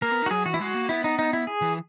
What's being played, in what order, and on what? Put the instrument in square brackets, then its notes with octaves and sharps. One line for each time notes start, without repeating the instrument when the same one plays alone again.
[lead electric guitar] A#3 [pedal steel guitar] A#4
[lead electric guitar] B3
D#4
[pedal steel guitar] F#4
[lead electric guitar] F#3 [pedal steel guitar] G#4
[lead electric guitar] E3 [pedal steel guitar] F#4
[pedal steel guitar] E4
[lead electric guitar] G#3 [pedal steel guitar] F#4
[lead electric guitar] A#3
[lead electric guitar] B3 [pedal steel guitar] E4
[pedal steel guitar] D#4
D#4
E4
G#4
[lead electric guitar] E3